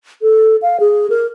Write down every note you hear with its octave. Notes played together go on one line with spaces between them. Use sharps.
A4
F5
G#4
A#4